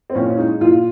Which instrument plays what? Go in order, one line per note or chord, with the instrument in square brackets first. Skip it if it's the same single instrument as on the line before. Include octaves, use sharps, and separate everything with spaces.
[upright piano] C4
A#2 C#4
C#4
G#3 D#4
A#2 F4